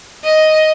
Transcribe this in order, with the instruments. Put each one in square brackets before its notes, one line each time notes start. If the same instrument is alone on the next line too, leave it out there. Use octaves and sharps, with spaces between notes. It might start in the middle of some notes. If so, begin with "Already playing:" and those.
[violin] D#5